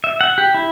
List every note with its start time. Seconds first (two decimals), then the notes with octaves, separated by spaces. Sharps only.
0.04 E5
0.21 F#5
0.38 G4
0.54 E4